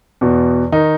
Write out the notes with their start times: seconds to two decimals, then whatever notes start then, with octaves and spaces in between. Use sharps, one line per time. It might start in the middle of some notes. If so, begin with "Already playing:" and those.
0.21 E2 B2
0.72 D#3 D#4